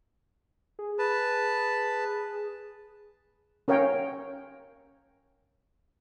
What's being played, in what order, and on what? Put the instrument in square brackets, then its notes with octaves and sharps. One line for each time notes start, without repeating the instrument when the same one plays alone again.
[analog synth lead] G#4
[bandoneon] B4 A5
[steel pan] C#4 A#4 C#5 F5 G5